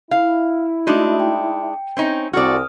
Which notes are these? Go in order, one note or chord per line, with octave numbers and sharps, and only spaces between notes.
E4 F5
G#3 A3 D4 D#4 F#4
G5
C4 C#4 D#4
C2 F#4 A4 D5 D#6 F6